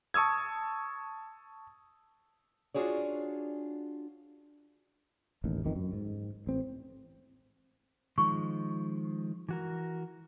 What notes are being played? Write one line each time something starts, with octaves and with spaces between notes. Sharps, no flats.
A5 C#6 D#6 E6 G#6
D4 F4 F#4 G#4 C#5 D5
E1 A1 D#2
G1 F2 D#3 E3
F#2
G#2
A1 C4
D#3 F3 G#3 C#6
E3 F#4 A#4